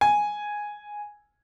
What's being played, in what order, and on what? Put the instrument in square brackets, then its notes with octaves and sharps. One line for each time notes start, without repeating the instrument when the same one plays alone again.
[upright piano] G#5